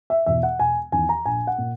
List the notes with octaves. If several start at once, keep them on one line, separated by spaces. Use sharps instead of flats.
E5
E2 B2 E5
F#5
E1 G#5
E2 D#3 G#5
A#5
A#1 G#5
F#5
A#2